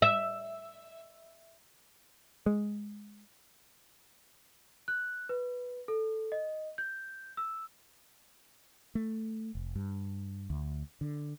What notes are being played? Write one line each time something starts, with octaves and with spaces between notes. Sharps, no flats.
E5
G#3
F#6
B4
A4
D#5
G6
E6
A3
F1
G2
D2
D3